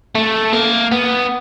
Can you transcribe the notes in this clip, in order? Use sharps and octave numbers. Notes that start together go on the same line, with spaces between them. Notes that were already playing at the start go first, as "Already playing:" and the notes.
A3
A#3
B3